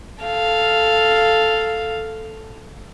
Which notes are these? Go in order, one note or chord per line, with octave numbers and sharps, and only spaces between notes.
A4 F5